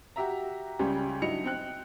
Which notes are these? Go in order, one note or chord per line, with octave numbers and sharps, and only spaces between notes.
F#4 G4 E5 A#5
C#2 C#3 G3 G4 G#4
G2 F#3 D#4 E4 C#7 F7
C4 G5 F#6